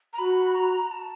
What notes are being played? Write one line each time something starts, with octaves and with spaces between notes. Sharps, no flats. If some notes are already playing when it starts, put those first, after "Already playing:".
A#5
F#4 B5
A#5
A5